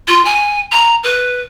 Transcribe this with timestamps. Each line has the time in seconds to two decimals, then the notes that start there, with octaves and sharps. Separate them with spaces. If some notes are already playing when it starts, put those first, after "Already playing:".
0.07 F4
0.25 G#5
0.72 A#5
1.03 B4